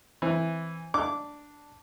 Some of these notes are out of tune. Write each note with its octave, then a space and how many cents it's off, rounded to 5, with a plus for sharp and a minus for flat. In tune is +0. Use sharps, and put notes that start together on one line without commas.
E3 +0 C4 +0
D4 +0 D6 -15